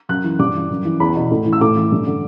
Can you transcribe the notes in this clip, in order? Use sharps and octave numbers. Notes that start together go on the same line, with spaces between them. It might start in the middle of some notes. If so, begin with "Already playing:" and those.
F#2 F#6
E3
G2 D6
E3
F#2
E3
E2 B5
B2
A2
E3
E6
A2 D6
E3
G2
D3